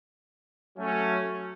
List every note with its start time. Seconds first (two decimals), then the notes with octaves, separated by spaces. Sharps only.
0.77 F#3 A3 C#4